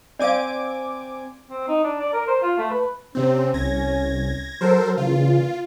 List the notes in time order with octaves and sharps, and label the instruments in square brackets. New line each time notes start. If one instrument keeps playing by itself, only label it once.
[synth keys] C4 G#5 D6 [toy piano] D5 F5
[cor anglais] C4
D#4
D4
D5
A#4
C5
F4
A3
B4
[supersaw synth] C3 C4 [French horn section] C#4
[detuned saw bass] C2 [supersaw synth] G#6 A#6
[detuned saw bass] F#3 [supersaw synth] A4 A#4 C5
[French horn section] A#2 E3 [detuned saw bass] C#3 [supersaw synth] F4